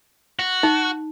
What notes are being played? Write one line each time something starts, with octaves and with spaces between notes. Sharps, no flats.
F#4
D#4